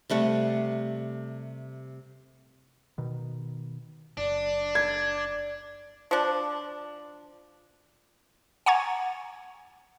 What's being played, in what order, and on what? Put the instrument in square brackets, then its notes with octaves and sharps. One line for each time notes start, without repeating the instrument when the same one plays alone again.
[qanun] C3 G3 A3 F#5
[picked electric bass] B2 D#3
[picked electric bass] F#1 [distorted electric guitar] D4 [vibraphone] D5
[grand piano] G#6
[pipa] F3 D4
[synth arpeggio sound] F#5 G#5 A#5 C#6 G#6